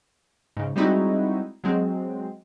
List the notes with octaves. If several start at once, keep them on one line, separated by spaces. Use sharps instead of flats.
G#2 C#3
G3 G#3 C4 D#4 E4 F#4
F#3 G#3 C4